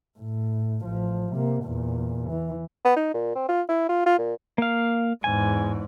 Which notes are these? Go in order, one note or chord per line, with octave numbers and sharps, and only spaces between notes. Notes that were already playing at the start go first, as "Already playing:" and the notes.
A2
A1 F3
C3 A#3
E2 A#2
E3
B3
D#4
A#2
C4
F4
E4
F4
F4
A#2
A#3 F5
E2 G#2 G#5